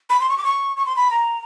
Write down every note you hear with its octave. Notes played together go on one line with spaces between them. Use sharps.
B5
C6
C#6
D6
C#6
C#6
C6
B5
A#5